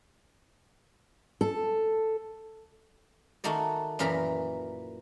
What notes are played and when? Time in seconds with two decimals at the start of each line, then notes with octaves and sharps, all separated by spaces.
1.41 A4
3.44 D#3 A3 D#4 F#4 D5
3.99 F#2 A#2 E3 A#4 A#5 B5